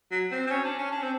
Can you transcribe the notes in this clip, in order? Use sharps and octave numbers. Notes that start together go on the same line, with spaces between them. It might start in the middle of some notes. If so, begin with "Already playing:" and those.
F#3
C4
C4
C#4
D4
C#4
D4
C4